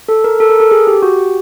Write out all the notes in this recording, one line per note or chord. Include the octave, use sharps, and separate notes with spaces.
A4
A#4
A4
A#4
A4
G#4
G4
F#4
G4